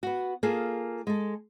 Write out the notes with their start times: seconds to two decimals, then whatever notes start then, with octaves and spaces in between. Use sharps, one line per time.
0.03 B3 F#4
0.43 A#3 F4 G#4 A4
1.07 G#3 A4